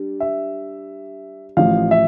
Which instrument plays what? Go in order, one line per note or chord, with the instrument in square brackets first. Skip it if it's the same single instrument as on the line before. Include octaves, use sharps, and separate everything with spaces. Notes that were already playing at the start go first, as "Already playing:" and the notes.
Already playing: [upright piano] G3 D4
[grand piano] E5
[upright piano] A1 A2 F3 [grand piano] F5
[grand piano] E5